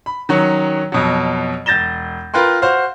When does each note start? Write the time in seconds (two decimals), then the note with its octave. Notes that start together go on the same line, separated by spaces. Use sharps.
0.06 B5
0.29 D#3 F#3 C#4
0.92 F2 B2 F#3
1.66 E1 G6 A6 A#6 E7 G7
2.34 F4 A#4 B4 G5 C6
2.62 F#4 C5 F5